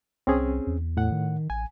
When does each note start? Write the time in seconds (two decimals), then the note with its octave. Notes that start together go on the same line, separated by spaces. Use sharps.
0.27 C2 C4 C#4 G#4
0.67 E2
0.97 A2 F#5
1.12 D#3
1.50 A1 G#5